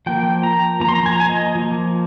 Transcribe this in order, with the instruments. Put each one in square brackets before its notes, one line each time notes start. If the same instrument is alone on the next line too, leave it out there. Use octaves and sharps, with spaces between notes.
[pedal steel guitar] F3 A#3 G5
A#5
F3 A#3 A#5
C6
A#5
G#5
A#5
G#5
D#5
F3 A#3